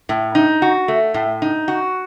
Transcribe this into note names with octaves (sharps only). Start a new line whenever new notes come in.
A2
D#4
F#4
A3
A2
D#4
F#4